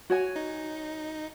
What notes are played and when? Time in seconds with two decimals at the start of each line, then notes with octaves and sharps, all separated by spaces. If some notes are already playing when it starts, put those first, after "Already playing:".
0.10 F#4 C#5 G#5
0.36 D#4